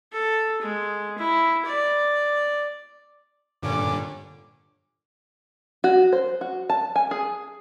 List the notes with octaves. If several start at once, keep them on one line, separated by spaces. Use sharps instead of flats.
A4
G#3
E4
D5
G2 A#2 D3 C#4 D6
F#4
C5
F#4
A5
G#5
G#4